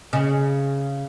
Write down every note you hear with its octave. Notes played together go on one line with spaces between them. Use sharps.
C#3